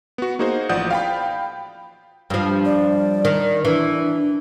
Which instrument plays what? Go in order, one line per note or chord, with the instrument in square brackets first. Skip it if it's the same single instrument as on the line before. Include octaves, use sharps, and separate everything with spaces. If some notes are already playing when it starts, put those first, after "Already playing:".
[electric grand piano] B3 F#4
A#3 D#4 F#4 G#4 C5
A1 F3 D5 F#5 D#6 G6
F5 G5 B5
[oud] G2 F3
[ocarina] D5
[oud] D#3
[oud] E3 [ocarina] D4